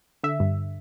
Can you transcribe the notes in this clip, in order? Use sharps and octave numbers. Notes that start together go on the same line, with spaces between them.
D3 E5
G2